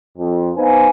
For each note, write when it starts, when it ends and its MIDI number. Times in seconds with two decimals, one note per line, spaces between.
0.18 0.51 41
0.57 0.89 59
0.57 0.89 63
0.57 0.89 71
0.57 0.89 72
0.57 0.89 77
0.57 0.89 80